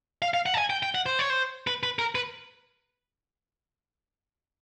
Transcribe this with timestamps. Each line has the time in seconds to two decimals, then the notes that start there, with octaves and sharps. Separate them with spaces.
0.22 F5
0.34 F5
0.46 F#5
0.54 A5
0.58 G#5
0.70 G5
0.83 G5
0.95 F#5
1.06 C5
1.19 C#5
1.30 C5
1.67 B4
1.83 B4
1.99 A#4
2.15 B4